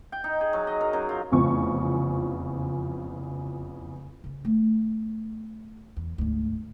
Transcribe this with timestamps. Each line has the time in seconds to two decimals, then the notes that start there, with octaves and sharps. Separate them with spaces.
0.12 G5
0.24 D#4
0.41 G#4
0.53 F#3
0.67 D#5
0.81 A#4
0.93 F#2
1.09 F4
1.32 F1 E2 C#3 F3 C#6
4.24 C#3 C#4
4.45 A3 B3
5.97 E2
6.18 D2 G#2